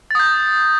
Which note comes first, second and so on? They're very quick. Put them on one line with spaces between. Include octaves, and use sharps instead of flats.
A6 D#6 G6